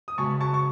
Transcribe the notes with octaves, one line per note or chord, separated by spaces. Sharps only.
D#6
C#3 G#3 B3 F#4 A5 C#6
A5 C#6
C#6